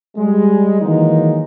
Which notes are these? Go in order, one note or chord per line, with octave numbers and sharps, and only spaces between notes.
G3 G#3
D#3 E3 F#3 G#3 A#3 D#4